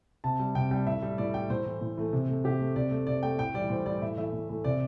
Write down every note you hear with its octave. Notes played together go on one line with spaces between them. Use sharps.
C3 A5
G3
C3 G5
G3 G5
A2 E5
G3
A2 D5
G3 G5
A2 C5
E3 A3
A2
E3 A3
C3
A3
C3 G4
A3
C3 D5
A3
C3 D5
A3 G5
A2 G5
E3 G3 D5
A2 C5
E3 G3 D5
A2 E5
E3 A3 E5
A2
E3 A3
C3 D5